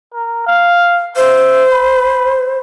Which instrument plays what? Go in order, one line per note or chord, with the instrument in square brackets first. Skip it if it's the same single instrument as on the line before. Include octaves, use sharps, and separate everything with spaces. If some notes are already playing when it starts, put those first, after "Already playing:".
[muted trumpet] A#4
F5
[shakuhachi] C5 [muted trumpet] E5
[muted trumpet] B5